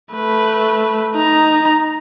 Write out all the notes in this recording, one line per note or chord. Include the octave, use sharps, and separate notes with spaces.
A3 B4
D#4 A#5